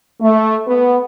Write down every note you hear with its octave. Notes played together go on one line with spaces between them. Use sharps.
A3
B3